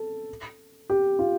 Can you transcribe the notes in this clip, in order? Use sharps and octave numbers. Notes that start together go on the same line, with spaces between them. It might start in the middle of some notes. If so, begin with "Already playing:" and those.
Already playing: A4
G4
F4